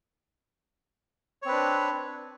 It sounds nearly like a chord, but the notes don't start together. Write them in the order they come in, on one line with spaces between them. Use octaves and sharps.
C#5 C4 B4 D4